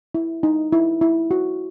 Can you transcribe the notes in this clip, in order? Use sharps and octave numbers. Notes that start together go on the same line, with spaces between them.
E4
D#4
E4
E4
F#4